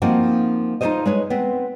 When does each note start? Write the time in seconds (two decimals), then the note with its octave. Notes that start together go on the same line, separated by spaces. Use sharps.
0.02 F3 A#3 C4 D#4 F#4
0.81 D#4 F4 F#4 A4 C5 D#5
1.05 G#3 B4 C#5
1.30 B3 C4